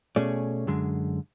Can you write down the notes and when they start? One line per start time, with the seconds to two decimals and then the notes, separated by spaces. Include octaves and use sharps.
0.16 B2 A3 C#4 G#4 D5
0.67 F#2 D3 G#3